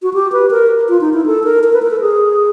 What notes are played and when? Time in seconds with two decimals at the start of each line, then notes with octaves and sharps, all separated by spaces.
0.03 F#4
0.14 G4
0.32 B4
0.51 A#4
0.89 F4
1.01 D#4
1.13 E4
1.26 A4
1.44 A#4
1.64 A#4
1.73 B4
1.82 A#4
1.91 A4
2.00 G#4